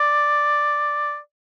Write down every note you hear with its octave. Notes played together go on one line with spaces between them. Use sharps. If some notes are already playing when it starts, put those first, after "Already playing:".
Already playing: D5